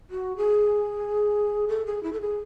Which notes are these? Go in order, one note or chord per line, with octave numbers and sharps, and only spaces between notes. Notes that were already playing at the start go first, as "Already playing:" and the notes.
F#4
G#4
A4
G#4
E4
A4
G#4